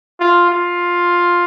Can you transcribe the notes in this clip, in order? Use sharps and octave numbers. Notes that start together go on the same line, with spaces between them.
F4
F4